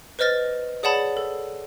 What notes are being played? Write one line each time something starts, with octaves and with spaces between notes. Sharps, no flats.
B4 C5 D#5 F6 A6 A#6
G#4 C#5 D5 F#5 A5 B5
A4